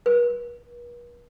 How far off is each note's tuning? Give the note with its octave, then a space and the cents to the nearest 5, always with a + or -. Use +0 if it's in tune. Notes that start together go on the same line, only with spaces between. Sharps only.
B4 -45